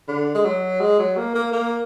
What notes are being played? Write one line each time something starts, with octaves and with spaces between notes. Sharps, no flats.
D3
G#3
F#3
G#3
F#3
A#3
A#3
A#3